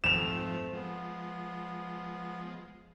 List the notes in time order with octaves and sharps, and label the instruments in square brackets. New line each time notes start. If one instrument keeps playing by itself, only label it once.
[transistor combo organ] F2 G#2 F3 [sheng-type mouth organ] A3 C4 [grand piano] E7 F7
[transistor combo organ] F3 G#3 [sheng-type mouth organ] B3